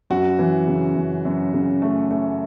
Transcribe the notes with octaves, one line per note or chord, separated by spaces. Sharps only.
F#2 F#4
E3
C#3
F#2
F#2
C#3
A3
A3